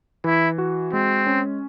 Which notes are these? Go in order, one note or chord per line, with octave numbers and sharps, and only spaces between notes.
E3 E4
F#4
G#3 C4
C#4